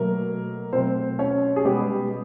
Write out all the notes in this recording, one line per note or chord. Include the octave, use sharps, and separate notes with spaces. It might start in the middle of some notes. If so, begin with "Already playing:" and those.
Already playing: B2 F#3 A3 A#3 A#4
B2 F#3 A3 C4 C5
C#4 C#5
G#4
B2 G3 G#3 B3 G4